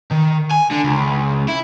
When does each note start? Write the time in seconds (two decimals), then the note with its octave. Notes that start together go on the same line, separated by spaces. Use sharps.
0.11 D#3
0.51 G#5
0.71 D3
0.84 C#2
1.48 E4